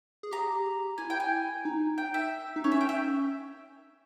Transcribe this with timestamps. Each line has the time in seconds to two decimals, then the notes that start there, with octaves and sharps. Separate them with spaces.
0.23 G#4
0.31 G4 A#5
0.98 E4 G#5
1.10 G5
1.20 G#5
1.65 D#4
1.98 G5
2.14 E5
2.56 D#4
2.64 C#4 C#5
2.72 E5
2.81 G5
2.89 E5